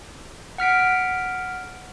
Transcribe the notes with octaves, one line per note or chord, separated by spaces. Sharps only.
F#5 F6 B6 D7